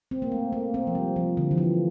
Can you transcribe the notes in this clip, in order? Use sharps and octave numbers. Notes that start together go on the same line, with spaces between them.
C4
A#3
A3
A#3
C4
F3
G3
F3
D3
E3
F3